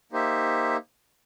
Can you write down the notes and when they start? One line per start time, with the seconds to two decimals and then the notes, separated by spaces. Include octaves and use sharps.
0.12 A#3 D#4 G4 C5 E5